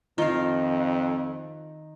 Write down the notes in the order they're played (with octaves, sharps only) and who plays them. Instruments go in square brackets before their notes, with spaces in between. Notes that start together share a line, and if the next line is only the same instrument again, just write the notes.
[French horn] F2 [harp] D#3 [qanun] F4 F5